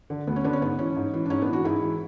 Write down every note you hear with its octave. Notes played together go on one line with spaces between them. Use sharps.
D3
D2 B3
C#4
D3 B3 D4
C#4
G#2 B3
E3 C#4
G#2
E3
D4
G#2 C#4
B3 D4
E3
D4 F#4
G#2 E4 G#4
E3